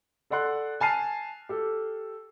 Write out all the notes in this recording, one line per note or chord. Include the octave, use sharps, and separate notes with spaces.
A4 D5 F#5 C6 F#6
G#5 A5 F6 C7 D#7
G4 A4